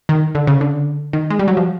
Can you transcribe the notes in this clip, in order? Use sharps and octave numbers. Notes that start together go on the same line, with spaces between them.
D#3
D3
C#3
D3
D#3
G#3
G3
F#3
F3